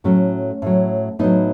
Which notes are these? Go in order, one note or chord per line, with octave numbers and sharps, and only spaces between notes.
A2 F#3 A3 C#4
A2 F#3
A2 F#3 B3 D#4